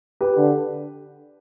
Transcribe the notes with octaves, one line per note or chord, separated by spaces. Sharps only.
G4 B4
D3